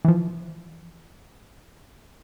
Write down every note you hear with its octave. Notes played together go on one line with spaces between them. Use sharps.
E3 F3